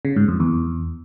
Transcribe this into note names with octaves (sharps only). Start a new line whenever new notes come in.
C#3
G#2
F2
E2